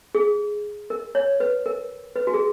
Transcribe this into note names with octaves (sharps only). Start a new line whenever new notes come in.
G#4
A#4
C#5
B4
A#4
B4
F#4
G#4